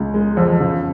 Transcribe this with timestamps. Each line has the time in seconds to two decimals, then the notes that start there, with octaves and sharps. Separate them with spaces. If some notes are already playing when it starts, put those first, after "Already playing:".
Already playing: C#2
0.14 G#3
0.37 F2
0.60 C#3